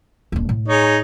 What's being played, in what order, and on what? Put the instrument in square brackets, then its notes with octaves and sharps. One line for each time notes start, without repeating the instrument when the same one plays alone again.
[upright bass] D#1 D4
A2
[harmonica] D#4 G#4 C#5